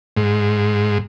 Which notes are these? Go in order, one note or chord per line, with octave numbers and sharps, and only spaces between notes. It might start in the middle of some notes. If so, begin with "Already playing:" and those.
G#2